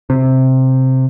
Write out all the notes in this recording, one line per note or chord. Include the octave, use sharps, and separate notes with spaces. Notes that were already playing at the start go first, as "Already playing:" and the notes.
C3